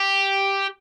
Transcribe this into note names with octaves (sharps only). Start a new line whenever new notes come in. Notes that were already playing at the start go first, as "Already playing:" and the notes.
Already playing: G4